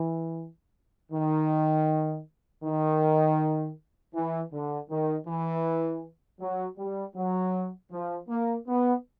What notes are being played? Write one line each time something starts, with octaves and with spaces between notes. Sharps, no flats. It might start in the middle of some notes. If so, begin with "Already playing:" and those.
Already playing: E3
D#3
D#3
E3
D3
D#3
E3
F#3
G3
F#3
F3
A#3
B3